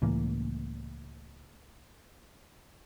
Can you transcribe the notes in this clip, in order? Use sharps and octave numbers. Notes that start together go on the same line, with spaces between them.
C#2 A2 E3 A#3